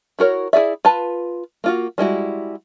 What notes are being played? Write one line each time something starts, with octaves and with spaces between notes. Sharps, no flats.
E4 F#4 A#4 C#5
E4 G#4 D5 E5
F4 B4 A5
A#3 F4 F#4
G3 G#3 E4 F#4